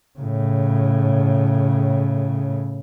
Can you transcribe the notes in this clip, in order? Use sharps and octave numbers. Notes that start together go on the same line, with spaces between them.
A2 C#3